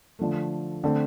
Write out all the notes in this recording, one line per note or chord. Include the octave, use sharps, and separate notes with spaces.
D3 F3 A3
D3 A3 C4